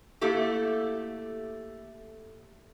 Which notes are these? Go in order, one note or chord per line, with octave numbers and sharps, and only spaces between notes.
A3 A#3 E4 G4 A4